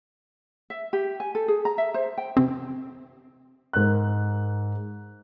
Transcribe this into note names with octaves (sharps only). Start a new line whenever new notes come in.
E5
G4
G#5
A4
G#4
A#5
E5
C5
G5
C3 C4
G#2 A#4 F#6